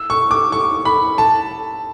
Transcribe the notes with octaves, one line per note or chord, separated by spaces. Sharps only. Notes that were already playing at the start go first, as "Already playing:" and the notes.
Already playing: E6
C#6
D6
C#6
B5
A5